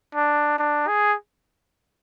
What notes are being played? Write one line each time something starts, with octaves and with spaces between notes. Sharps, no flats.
D4
D4
G#4